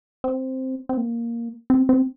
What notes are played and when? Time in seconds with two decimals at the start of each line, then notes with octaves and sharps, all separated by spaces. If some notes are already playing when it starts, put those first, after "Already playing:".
0.24 C4
0.89 C4
0.97 A#3
1.70 C4
1.89 C4